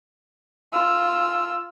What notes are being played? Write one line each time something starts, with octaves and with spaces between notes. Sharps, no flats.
F4 E6